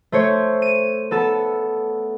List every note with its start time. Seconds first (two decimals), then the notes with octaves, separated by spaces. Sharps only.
0.12 A3 C5 C#5
0.62 D#7
1.11 B3 A4 A5